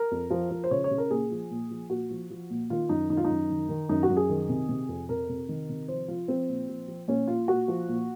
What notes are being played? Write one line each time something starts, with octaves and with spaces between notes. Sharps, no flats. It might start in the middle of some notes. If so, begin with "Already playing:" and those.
Already playing: A#4
F2
F3
F3
C5
C#3 C#5
C#5
C#3
A#4
A#2 G#4
F3
A#2
F3
A#2 F#4
F3
F3
A#2
D#3 F4
F#2 D#4
D#3 D#4
F4
F#2 D#4
D#3
D#3
F#2 D#4
F#4
F#2
G#4
D#3
C3
C3
F2
C3 A#4
C3
D#3
C3
F3 C5
F3 F4
F3 C4
A#2
F3
F3
A#2 C#4
A#2 F4
A#2 F#4
F3
A#2